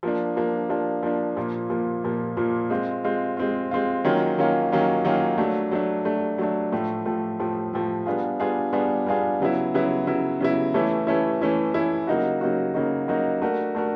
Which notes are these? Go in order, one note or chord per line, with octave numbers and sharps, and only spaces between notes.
F3 A#3 D4
F3 A#3 D4
F3 A#3 D4
F3 A#3 D4
A#2 F3 A#3
A#2 F3 A#3
A#2 F3 A#3
A#2 F3 A#3
G#3 C4 F4
G#3 C4 F4
G#3 C4 F4
G#3 C4 F4
D#3 F#3 A#3 C#4 F4
D#3 F#3 A#3 C#4 F4
D#3 F#3 A#3 C#4 F4
D#3 F#3 A#3 C#4 F4
F#3 A3 D4
F#3 A3 D4
F#3 A3 D4
F#3 A3 D4
A2 F3 A3
A2 F3 A3
A2 F3 A3
A2 F3 A3
G3 B3 D4 F4 G#4
G3 B3 D4 F4 G#4
G3 B3 D4 F4 G#4
G3 B3 D4 F4 G#4
C#3 F#3 B3 E4
C#3 F#3 B3 E4
C#3 F#3 B3 E4
C#3 F#3 B3 E4
E3 A3 C#4 E4
E3 A3 C#4 E4
E3 A3 C#4 E4
E3 A3 C#4 E4
C#3 F#3 A#3 D#4 F#4
C#3 F#3 A#3 D#4 F#4
C#3 F#3 A#3 D#4 F#4
C#3 F#3 A#3 D#4 F#4
A3 D4 F#4 A#4
A3 D4 F#4 A#4